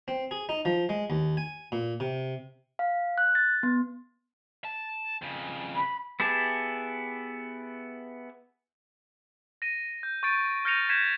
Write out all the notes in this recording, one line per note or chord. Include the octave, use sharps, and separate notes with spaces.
C4
G#4
D#4
F3
G#3
D#2
G#5
A#2
C3
F5
F#6
A6
B3
A5
F2 C#3
B5
B3 E4 G4 G#4 A5
A#6 D#7
G6
C#6 G6 A6 D7 D#7
F6 G6 A#6 C#7 D#7 F7
G6 G#6 B6 C#7 E7